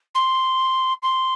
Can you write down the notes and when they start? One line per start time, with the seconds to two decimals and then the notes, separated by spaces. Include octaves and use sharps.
0.15 C6
1.03 C6